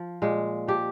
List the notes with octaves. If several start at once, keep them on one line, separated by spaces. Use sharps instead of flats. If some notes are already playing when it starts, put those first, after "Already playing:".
Already playing: F3
A#2 G#3
F3 G4